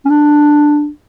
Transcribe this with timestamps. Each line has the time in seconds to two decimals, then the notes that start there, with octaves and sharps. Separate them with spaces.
0.05 C#4
0.10 D4